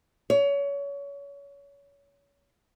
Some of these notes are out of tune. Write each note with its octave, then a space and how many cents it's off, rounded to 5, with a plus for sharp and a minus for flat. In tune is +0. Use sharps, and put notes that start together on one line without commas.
C#5 +30